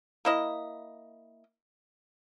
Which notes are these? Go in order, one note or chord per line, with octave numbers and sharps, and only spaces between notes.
A#3 E4 D#5